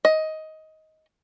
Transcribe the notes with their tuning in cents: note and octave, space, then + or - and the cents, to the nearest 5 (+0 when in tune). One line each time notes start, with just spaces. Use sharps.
D#5 +15